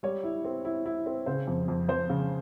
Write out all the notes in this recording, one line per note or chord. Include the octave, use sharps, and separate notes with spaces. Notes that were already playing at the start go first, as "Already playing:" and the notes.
G3 C#5
E4
C4
E4
E4
C4
C#3 C5
F2
F2
F2 C5
C#3